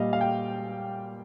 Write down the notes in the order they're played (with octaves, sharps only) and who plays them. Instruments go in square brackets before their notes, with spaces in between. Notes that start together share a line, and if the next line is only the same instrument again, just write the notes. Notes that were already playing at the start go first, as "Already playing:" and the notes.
Already playing: [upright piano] A#2 G3 D#5 F5
F5
G5